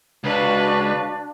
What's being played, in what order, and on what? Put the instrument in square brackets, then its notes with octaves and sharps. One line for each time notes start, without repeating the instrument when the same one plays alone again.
[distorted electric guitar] C#2 [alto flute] D4 [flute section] F#4 F5 [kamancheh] B4